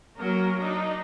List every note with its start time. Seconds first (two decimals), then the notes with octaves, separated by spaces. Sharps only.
0.17 F#3 A#3 C#4 A#4
0.59 D4 D#4